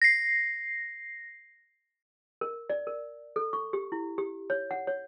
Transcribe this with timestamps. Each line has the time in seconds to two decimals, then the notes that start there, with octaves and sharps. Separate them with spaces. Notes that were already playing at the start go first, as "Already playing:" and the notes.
0.02 A#6 C7
2.41 A#4
2.70 D5
2.87 A#4
3.36 A4
3.53 C#6
3.73 G4
3.92 E4
4.18 G4
4.50 C#5
4.71 F#5
4.87 C#5